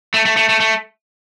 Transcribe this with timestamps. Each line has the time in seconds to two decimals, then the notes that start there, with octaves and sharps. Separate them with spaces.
0.14 A3
0.25 A3
0.37 A3
0.49 A3
0.60 A3